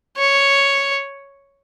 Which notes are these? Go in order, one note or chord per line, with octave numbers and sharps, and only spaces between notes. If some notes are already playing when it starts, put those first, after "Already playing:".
C#5